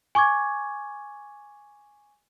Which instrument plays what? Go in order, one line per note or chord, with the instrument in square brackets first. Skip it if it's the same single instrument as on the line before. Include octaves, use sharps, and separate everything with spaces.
[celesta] G#5 C#6 D6 G#6